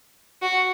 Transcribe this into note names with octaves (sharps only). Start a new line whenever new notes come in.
F#4